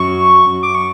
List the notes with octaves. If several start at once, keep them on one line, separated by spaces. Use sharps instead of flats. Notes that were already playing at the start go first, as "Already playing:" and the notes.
Already playing: F#2 C#6
F#2
D6
C#6